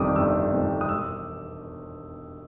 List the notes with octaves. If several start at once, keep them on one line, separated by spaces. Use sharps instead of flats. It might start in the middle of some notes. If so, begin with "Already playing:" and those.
Already playing: G1 F2 C3 D#3 G3 D6 D#6
G1 E6
F2 C3 D#3 G3
D#6
E1 E6